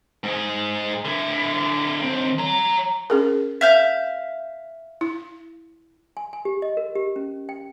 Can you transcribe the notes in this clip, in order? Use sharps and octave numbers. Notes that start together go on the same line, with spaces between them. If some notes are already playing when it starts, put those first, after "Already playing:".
G#2 G#4
D3 E4
D#2 C4
C#5 A#5
C#4 G#4 A#4
E5 F5 G6
E4
G#5
G#5
G4
D#5
A#4
G4
C#4
G5